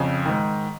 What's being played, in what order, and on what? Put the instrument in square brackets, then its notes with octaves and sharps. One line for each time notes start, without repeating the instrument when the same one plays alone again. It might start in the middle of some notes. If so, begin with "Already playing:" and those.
Already playing: [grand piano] F2 C#3
G#2 D#3